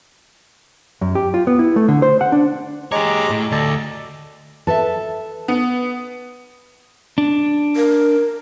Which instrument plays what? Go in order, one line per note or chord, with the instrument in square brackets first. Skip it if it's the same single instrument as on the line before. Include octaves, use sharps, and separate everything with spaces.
[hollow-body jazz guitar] F#2
G4
F4
B3
E4
A3
D3
C5
F#5
D4
[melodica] G#3 A#5 D6 [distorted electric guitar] G4 C#5
[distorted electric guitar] A2
[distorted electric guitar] D2 [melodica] A4 D5 D#5
[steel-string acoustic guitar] A4 A5 [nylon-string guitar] B4 E5
[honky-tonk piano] B3
[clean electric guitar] D4
[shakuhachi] A#4